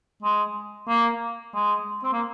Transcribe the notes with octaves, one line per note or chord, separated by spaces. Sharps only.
G#3
A#3
G#3
C4
A#3